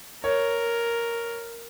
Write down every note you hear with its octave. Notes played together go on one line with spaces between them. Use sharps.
A#4 C#5